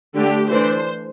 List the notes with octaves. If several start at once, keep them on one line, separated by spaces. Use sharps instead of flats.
D3 A3 D4 G4
E3 A3 D4 C5